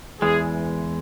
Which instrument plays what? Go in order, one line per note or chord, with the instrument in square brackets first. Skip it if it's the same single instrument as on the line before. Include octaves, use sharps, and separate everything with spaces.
[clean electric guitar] E2 E3 G#3 [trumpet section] G#4